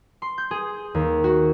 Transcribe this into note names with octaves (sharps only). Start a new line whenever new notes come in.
C6
G6
G#4
D#2
F#4